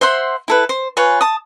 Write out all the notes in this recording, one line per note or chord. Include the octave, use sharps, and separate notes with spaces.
C5 E5 F#5 C6
E4 A4 B4
C5
F4 B4 C#5 G#5
A5 D#6